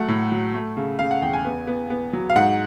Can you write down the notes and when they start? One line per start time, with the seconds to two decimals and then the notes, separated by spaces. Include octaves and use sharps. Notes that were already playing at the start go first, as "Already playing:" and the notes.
Already playing: F#3 A3 F#5
0.08 A2
0.32 F#3
0.54 A3
0.77 C#3
0.99 C#3 F5
1.11 F#5
1.22 E2 G5
1.33 G#5
1.45 B3
1.67 B3
1.90 B3
2.13 F#3
2.30 F5
2.35 G#2 F#5